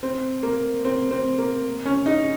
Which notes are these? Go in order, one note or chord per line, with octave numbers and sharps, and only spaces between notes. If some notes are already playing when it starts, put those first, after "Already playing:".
C4
A#3
C4
C4
A#3
C#4
D#4